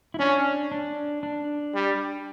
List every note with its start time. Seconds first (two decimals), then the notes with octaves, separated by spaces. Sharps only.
0.14 E4
0.20 C#4 D4
0.72 D4
1.23 D4
1.74 G3